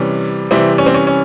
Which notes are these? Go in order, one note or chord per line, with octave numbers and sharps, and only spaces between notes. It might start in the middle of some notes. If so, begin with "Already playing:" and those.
Already playing: C3 E3 G3 C#4
C3 E3 G3 C4 E4
C#4
C4
C#4
C#4